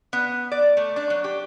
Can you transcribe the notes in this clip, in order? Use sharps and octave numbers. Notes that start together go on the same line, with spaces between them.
B3
D5
A3
D4
F#3
G4